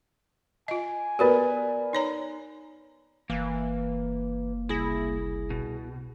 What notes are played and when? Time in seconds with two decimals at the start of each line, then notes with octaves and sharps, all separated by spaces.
0.68 F4 D#5 G#5
1.19 B3 F#4 G4 A#4 B4 D5
1.93 D#4 C#5 A#5
3.30 F#1 E3 A#3 F5
4.69 C2 E4 G#4 A#6
5.50 B2